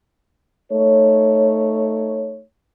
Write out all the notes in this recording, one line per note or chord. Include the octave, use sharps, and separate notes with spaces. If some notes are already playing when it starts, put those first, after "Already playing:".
A3 D#4 C#5